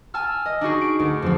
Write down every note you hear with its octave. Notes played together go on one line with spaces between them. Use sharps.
G#5 A5 E6 F6
D#5
D4 D#4 F#4 G#4
D7
D2
F2 F3